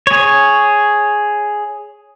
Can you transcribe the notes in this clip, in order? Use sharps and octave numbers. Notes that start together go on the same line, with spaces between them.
G#4 C#5